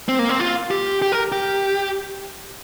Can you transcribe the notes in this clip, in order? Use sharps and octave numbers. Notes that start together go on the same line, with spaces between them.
C4
A#3
C4
F4
G4
G4
A#4
G4